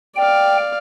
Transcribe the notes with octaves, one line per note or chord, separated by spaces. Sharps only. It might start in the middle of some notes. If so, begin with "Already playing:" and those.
D5 F5 G5